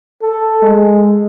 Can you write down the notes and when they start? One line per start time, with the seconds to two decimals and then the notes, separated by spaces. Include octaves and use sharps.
0.22 A4
0.62 G#3